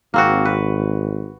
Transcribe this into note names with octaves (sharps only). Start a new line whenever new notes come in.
G#1 A#3 C4 F#4
B4